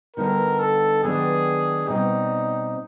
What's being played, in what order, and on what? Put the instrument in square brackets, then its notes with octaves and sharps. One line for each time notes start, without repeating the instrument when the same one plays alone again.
[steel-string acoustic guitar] D3 G3 B3 D#4 F#4 [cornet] A#4
[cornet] A4
[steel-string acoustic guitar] D#3 F#3 B3 D4 G4 [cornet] G#4
[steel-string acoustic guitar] B2 G3 C4 [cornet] D#4